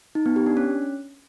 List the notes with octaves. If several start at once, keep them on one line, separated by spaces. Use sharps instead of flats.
D#4
B3
G4
D4
C#4